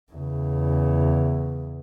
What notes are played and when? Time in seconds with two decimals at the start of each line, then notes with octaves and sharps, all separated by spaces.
0.12 E2 C#3